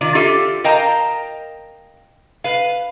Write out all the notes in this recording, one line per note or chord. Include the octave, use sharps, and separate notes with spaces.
D#3 F4 D5
F4 G4 A4 E5
A#4 D#5 F5 G5 A5 A#5
B4 F5